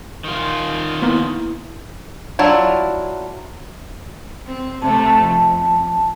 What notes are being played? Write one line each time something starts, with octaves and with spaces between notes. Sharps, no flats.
D#3 F4
A#3 B3 E4
F#3 D4 E4 F4
C4
C3 A3 A5
F2